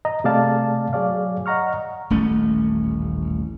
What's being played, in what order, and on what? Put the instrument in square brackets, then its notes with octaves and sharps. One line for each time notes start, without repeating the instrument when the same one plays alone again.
[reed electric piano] D#5 A#5
C3 A3 G#4 D5 F5 A5
F#3 G#4 C#5 D5 F5
D#5 F#5 A#5 C#6 F6
[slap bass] D#1 A1 A3 C#4